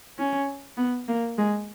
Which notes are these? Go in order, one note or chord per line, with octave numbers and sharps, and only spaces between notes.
C#4
B3
A#3
G#3